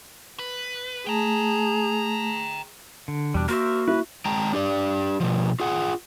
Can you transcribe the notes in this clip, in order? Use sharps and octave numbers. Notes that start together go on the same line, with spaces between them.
B4
A3 G#4 G5 A5 A#5
D3
E2 B2 G3 D4
A#3 F#4 A#4 C5 E5
E4 B4
G#3 G5 A5 A#5
D4 G4 D5
B2 F3
F4 G#4 F#5